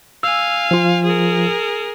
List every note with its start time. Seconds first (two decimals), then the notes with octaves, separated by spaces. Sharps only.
0.23 F5 G#5 E6
0.71 F3 F4
1.04 G#4 A#4